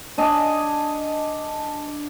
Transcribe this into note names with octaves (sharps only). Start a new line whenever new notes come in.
D4 D#5 G#5